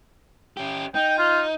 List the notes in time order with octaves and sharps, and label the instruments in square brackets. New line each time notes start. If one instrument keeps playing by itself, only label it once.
[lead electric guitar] C#4 G4
[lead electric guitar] D#4 [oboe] G5
[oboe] F4